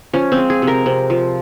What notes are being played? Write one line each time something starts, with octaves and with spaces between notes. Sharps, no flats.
F3 C#4
C4
G#3
G#4
C3
A#4
C3
F3